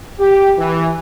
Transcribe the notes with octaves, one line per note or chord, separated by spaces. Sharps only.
G4
E3